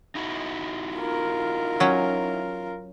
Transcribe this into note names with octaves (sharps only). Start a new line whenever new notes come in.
D#4 E4 F#4
F4 A#4
F#3 C#4